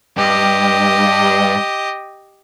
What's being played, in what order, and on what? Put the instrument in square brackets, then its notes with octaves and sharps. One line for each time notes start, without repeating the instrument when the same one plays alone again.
[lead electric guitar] G2 [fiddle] G4 D#5